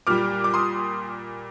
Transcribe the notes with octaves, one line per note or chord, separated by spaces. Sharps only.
A#2 G3 D6 F6
D6
C6 D#6